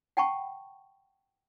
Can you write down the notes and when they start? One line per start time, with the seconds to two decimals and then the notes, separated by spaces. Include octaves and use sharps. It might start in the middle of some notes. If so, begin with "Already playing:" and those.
0.17 F#5 G5 A5 B5 C#6